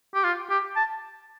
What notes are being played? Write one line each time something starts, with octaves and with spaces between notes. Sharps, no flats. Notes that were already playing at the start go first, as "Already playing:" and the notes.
G4
F4
G4
A5